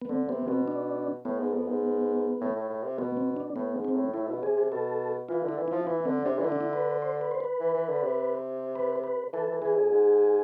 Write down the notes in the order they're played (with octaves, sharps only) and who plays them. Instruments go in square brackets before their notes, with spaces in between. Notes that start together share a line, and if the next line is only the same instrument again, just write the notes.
[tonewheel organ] B3
[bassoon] D3 [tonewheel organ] C4
[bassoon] C3 [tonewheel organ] B3
[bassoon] B2 [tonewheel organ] C4
[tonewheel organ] D4
[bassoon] A2 [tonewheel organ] B3
[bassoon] G#2
F2
G#2
A2
A2
A2
C3
[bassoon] B2 [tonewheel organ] B3
[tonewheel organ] C4
D4
[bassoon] A2 [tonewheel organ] B3
[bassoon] G#2
[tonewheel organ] C4
[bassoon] A2
[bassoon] A2 [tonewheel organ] E4
[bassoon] B2
[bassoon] C3 [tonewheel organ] G#4
[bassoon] C3
[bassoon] B2 [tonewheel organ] A4
[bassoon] E3 [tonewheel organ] F4
[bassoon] D3 [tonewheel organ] E4
[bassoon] E3
[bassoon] F3 [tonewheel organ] E4
[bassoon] E3 [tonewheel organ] E4
[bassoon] D3 [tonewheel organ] C4
[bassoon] C3 [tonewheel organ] D4
[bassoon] E3
[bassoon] D3 [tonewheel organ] E4
[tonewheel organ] D4
E4
B4
C5
B4
C5
B4
[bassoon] E3
E3
D3
C3
[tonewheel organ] B4
B4
[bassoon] E3 [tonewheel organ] A4
[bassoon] E3
[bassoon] E3 [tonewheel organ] G#4
[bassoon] F2
G#2